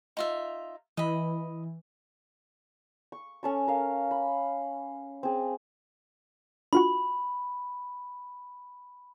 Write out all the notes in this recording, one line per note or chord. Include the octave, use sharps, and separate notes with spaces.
D#4 F4 E5
E3 D#5 B5
C#6
C#4 A4 C#6
A#4 F5
B5
C4 G#4
D4 F4 F#4 B5